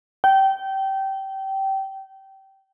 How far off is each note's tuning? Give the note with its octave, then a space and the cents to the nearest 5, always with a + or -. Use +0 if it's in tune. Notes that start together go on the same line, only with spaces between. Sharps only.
G5 -20